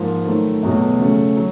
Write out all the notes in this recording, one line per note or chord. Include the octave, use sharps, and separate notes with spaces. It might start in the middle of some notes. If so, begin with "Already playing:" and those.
Already playing: G#2 F3 A#3
D#3 F#3 A3
E2 B2 F#3 A3
C#3 F#3 A3
F#3